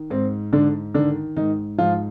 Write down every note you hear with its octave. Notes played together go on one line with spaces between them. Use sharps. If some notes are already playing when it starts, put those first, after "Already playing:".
Already playing: D#3
G#2 C4
G#2 D3 D4
D3 D#3 D4
G#2 D#3 D#4
G#2 F3 F4